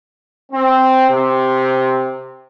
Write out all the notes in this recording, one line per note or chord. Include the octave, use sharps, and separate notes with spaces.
C4
C3